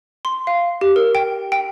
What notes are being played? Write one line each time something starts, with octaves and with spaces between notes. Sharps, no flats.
C6
F5
G4
A#4
G5
G5